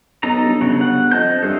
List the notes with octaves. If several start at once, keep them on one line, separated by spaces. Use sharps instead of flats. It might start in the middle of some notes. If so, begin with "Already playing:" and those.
B1 D#4 A4 A#5
G1
C#3 F#3
F#5
F2 D#5 A5 G6
G2 E3 G#4 A4